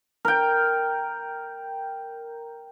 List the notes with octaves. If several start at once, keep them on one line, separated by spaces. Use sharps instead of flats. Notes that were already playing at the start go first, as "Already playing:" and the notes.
A#4 G5